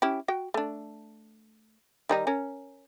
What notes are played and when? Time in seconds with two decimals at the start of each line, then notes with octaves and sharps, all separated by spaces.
0.02 C#4 E4 G4
0.28 F#4 G5
0.54 A3 D4
2.09 D#3 G3 D#4
2.27 C#4 A#4